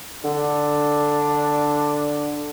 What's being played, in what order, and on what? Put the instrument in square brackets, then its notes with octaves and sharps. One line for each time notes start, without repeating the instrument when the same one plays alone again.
[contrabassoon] D3 [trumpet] D4